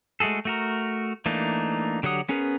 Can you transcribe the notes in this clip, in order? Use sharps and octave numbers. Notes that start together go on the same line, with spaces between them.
G#3 A3 F#4 G#4 A4
A3 F#4 A#4
E3 A3 A#3 D4 D#4
D3 F#3 G4 F#5 D#6
B3 C#4 G#4 A#4 B4